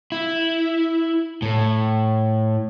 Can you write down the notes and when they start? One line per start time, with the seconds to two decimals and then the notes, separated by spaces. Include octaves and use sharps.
0.12 E4
1.42 A2